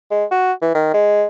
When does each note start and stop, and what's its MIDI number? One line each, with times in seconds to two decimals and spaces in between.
0.11 0.25 56
0.31 0.53 66
0.62 0.72 52
0.75 0.94 51
0.94 1.25 56